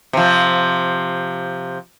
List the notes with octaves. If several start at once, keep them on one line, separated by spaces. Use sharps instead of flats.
C3 F3